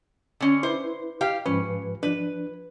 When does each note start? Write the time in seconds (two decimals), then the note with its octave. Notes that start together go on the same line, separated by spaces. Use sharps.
0.41 D3 C#4
0.63 E4 B4 C5
1.21 G4 F5
1.46 G#2 F3 C#4 B4
2.03 F3 D4 B4